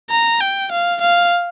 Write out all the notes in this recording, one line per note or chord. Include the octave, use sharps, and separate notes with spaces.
A#5
G5
F5
F5